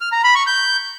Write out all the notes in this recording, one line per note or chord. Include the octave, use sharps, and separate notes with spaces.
F6
A#5
B5
C#6
G6